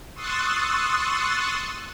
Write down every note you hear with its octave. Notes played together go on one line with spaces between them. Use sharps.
C6 C#6 D#6 E6 F#6 A6